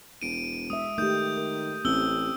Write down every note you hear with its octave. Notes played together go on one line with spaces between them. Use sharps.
E1 D7 D#7
G#3 E5 D#6
D#3 A3 G4 D#6 G6
A#4
A1 C4 C#4 E6 G7